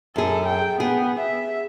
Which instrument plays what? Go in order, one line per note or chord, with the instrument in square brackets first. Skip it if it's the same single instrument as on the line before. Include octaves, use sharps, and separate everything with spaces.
[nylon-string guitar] F#2 G#4 [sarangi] A4
[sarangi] G5
[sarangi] B3 [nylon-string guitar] G#4
[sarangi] E5